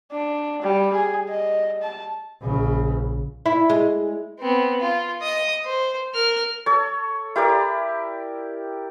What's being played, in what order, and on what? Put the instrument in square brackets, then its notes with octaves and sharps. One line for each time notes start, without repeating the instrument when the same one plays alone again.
[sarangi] D4
G3
G#4
D#5
A5
[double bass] A#1 C#3
[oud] E4
G#3
[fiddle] B3 C4
F4
D#5 D#6
C5
A#4 F6
[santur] A4 C#5
E4 G4 A#4 D5